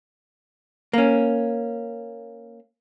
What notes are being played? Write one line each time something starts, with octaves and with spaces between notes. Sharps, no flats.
A#3 C#4